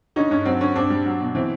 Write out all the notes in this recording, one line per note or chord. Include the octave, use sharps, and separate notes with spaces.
D3 C#4 D#4
G2 C#4
F#3 C4
D3 C#4
G2 C4 D4
G3
F#3
B2
E3 C4